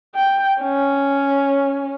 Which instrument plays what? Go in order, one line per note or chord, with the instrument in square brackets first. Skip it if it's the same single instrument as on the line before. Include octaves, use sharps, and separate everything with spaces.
[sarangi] G5
C#4